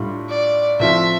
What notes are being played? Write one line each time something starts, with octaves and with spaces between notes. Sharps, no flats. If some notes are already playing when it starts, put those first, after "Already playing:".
Already playing: A2 G3 D4 F4
D5
A2 F3 C4 F4 E5